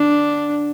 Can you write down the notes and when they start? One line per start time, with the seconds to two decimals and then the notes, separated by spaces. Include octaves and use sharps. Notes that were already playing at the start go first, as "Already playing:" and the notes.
Already playing: D3 D4